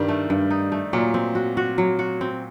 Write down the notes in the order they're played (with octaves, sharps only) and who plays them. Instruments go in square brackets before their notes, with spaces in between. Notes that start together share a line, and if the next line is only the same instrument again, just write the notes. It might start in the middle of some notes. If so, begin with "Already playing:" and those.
Already playing: [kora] G2 [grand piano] D#3 G3
[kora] A3
G2
D#4
A3
[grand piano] A#2 [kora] F#3
[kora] C4
F#4
F#4
F#3
F#4
C4